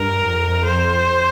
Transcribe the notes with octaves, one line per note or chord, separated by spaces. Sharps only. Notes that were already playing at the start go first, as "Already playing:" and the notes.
Already playing: G2 A#4
F2
C5